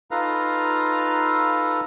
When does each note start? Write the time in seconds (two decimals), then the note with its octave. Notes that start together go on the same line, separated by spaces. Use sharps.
0.11 D#4 F4 A4 B4 F5 A#5